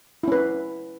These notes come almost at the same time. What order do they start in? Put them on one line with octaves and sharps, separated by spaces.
E4 C#4 B4